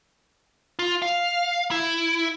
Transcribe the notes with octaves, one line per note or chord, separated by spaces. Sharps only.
F4
F5
E4